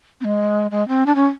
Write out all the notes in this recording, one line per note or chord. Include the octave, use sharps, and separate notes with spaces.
C4
G#3
G#3
C4
D4
C#4